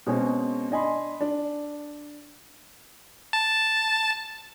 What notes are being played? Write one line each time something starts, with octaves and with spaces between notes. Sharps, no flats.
B2 G#3 C4 C#4
D4 D#5 G#5 B5 C6
D4
A5